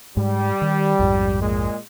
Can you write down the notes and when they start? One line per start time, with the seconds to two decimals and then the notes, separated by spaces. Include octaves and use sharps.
0.17 G#2 G3 G#3
0.61 D#3
0.99 A#1 F2 G#2
1.41 A#2 G#3